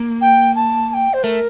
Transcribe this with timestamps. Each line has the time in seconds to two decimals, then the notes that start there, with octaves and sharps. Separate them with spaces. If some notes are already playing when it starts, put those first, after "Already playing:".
Already playing: A#3
0.21 G5
0.55 A5
0.89 A5
0.94 G5
1.14 C5
1.23 A3 A#4